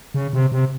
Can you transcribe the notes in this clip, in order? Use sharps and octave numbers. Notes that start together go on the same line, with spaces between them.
C#3
C3
C3